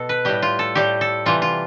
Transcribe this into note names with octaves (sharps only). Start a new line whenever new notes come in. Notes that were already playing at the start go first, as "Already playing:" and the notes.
Already playing: B2 A4
B4
A2 G3 G4
F4
A4
A2 G3 G4
A4
C3 E3 G3 F4
F4